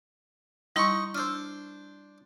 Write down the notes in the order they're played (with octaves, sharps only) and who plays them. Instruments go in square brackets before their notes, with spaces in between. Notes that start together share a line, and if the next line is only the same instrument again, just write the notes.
[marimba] G3 E4 C6 [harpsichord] D#4 C#6
[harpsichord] D4 C5 [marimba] E6 F6